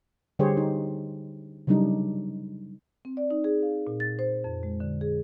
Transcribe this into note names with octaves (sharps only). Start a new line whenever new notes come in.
D3 G3 G4 G#4 C5 C#5
D#4
C#3 F#3 G3 D4 D#4
C4
D5
D#4
G#4
F5
A#2
A6
C5
F2
G#3
D3
G#4